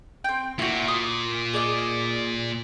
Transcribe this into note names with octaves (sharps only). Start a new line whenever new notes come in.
C4 G5
A#2 E4 F#4
D#6
G#4 D5 D#5